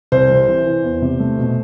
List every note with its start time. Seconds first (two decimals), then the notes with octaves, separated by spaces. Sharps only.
0.12 C2 C5
0.30 C3
0.48 E3
0.66 E3
0.84 E2
1.02 C3
1.20 A3
1.38 B2